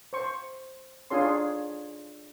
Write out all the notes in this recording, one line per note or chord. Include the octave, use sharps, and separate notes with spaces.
C5 C#6
D4 D#4 F4 G#4 C#5 C6